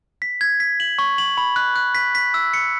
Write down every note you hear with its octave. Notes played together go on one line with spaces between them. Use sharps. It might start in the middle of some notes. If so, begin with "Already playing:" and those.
B6
G#6
B6
F#7
C#6
F#7
B5
F#6
F#6
B6
B6
E6
C#7